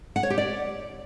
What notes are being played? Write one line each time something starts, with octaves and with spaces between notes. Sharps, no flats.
F#5
C#5
G4
D5